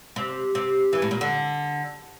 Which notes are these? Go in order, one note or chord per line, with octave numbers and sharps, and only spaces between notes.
C3
C3
E3
A2
A#2
D3